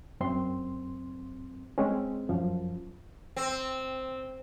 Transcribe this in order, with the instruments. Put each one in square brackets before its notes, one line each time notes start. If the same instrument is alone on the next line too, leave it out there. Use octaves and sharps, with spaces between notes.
[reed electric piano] F#2 C4 C6
G#3 C4 C#4
F#2 F3
[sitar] C4